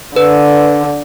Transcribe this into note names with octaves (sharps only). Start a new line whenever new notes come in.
D3 B4